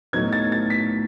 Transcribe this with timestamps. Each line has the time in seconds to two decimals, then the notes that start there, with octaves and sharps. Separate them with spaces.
0.13 A2 F#3 B3 D#4 G#6
0.33 A6
0.52 A6
0.70 B6